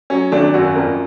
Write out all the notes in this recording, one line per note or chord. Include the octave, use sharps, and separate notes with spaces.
F#3 C#4
G#1 D4
F#2 F#4
F2 A#4